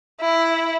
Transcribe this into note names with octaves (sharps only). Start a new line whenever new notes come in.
E4